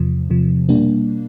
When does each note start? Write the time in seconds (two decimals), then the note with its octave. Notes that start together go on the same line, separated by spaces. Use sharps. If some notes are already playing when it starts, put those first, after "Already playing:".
Already playing: E2 C3 F3
0.30 E2 C3 F3
0.69 B2 G3 A#3 D4